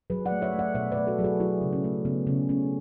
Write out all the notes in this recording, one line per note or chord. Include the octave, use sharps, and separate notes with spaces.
F#3 G#4 B4
D5 F#5
A3
C#5 E5
A3
D5 F#5
B2 C#5 E5
B4 D5
A3
F#4 A4
F#3 G#4
F#4 A4
F#3 E4 G#4
C#3
C#4
A3
C#3 B3
C#3 C#4
A3 C#4